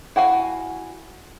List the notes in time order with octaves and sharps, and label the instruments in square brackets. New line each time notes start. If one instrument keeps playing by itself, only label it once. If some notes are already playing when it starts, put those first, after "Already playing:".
[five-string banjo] E4 F#4 F5 G#5